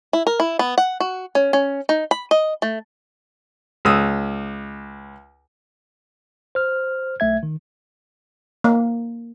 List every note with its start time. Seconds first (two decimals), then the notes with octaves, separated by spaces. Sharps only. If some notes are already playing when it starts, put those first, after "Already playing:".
0.13 E4
0.27 A#4
0.40 E4
0.59 B3
0.78 F#5
1.00 F#4
1.35 C#4
1.53 C#4
1.89 D#4
2.11 B5
2.31 D#5
2.62 A3
3.85 C#2 D#6 E6
6.55 C5 F6
7.20 B1 A3 E5 G#6
7.43 D#3
8.64 A#3